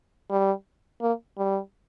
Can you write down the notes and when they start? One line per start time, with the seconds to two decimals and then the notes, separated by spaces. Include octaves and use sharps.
0.30 G3
1.01 A#3
1.37 G3